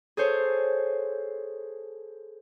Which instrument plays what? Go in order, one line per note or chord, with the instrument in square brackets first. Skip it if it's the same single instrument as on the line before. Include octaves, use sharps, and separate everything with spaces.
[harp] G#4 A4 C5 C#5